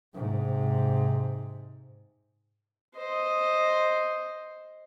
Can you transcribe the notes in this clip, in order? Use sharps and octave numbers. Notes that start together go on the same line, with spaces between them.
G#2 C3
C5 D#5